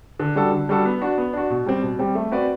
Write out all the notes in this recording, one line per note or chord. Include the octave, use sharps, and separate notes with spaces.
D3
G3 D4 F#4 A4
D3
G3 D4 F#4 A4
B3
D4 F#4
B3
D4 F#4
B2
G3 C4
B2
G3 C4
A3
C4 F#4 B4 D5